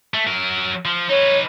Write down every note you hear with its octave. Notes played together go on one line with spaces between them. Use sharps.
A3
F#3 A#4
F3
D#4 B4 C#5